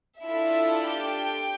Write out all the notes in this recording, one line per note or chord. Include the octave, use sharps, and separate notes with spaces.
D4 E4 F4 A4 E5
G4 G5